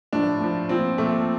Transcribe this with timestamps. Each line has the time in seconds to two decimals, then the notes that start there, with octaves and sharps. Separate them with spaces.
0.13 A2 F3 D4
0.41 A2 F3
0.69 A#2 F3 C4
0.98 A#2 F3 A3